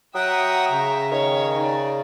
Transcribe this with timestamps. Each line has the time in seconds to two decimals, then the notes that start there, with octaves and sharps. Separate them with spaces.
0.15 F#3 E5 F#5 G5 A#5 D#6
0.70 C#3
1.11 D#3 C#5
1.57 D#4 D5